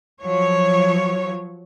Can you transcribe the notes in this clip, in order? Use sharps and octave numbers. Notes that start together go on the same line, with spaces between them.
F3 F#3 C#5